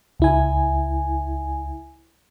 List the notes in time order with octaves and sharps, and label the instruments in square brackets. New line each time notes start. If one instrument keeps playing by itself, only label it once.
[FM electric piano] C#2 E4 G#5